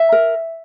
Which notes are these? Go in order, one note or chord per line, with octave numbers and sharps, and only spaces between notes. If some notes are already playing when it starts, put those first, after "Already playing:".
Already playing: E5
A#4